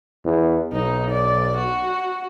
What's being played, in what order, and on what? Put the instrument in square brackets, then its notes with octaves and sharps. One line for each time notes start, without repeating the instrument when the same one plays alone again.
[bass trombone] E2
[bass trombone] B1 [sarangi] D#4
[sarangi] D5
F#4